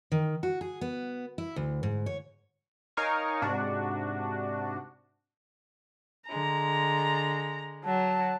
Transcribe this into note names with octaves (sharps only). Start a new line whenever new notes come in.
D#3
F#4
G#4
B3
E4
D2
G#2
C#5
D#4 A#4 C#5 F5 G#5 C#6
G#2 C3 D4 F#4
D3 G#3 A#5
F#3 A5